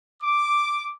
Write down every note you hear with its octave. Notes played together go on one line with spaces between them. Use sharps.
D6